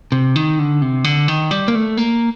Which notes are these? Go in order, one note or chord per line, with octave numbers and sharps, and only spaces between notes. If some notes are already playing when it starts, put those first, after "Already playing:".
C3
D#3
D3
C3
D3
D#3
G3
A#3
A3
A#3